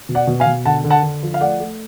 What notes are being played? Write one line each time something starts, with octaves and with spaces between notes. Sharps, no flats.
B2
D5 F#5
B2
F5 G#5
B2
D3 F#5 A5
D3
F#5 A5
D3
F3
F5
A3 D5 F#5
A3